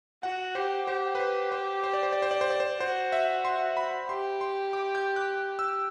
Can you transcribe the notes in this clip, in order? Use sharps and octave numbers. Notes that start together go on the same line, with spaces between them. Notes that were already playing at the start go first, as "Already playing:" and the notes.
F#4 F#5
G4 C5
G4 C5
B4
C5
C5
C5
D5
C5
D5
C5
D5
C5
D5
C5
F#4 C5
E5
C6
B5
G4 C6
C6
D6
G6
F#6
E6